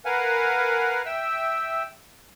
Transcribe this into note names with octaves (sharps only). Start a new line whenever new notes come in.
A#4 B4 F5 F#5 G#5
E5 G5 E6